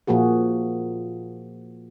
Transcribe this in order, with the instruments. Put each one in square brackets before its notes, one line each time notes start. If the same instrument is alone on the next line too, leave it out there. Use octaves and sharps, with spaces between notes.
[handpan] A#2 F3 A#3 F#4 G#4